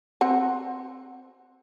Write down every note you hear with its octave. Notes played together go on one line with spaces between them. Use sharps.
C4 F#5